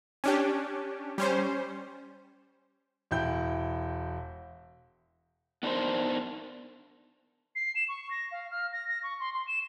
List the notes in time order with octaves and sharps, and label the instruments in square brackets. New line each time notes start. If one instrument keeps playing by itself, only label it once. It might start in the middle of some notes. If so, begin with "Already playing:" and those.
[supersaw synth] C#4 D4 G4
G3 C#4 C5
[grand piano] E1 E4 G5 G6
[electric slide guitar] B3 D4 D#4 A#4 C5
[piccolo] C7
E7
C#6
A#6
F5
F6
A#6
A#6
C#6
C6
C6
E7